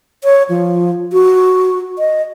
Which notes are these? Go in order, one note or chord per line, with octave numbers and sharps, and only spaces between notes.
C#5
F3
F#4
D#5